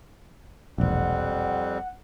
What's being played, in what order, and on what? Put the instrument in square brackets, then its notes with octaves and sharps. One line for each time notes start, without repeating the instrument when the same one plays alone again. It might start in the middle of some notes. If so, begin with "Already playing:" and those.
[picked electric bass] E1 A#1 [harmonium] F2 G3 C4 [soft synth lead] F#5